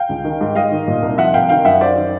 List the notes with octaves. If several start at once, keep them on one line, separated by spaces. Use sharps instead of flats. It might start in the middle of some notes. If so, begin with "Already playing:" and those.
Already playing: F5 G5
C#2
D#3
G#2
G#2 D#5 F5
D#3
A#2
C2
F3 E5 F#5
C2 F5 G5
D#3 F5 G5
F#2 E5 F#5
F#2 C5 D5
D#3